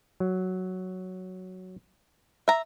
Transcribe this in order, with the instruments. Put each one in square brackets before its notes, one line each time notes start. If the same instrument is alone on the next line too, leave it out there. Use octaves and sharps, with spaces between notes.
[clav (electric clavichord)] F#3
[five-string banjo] E5 A#5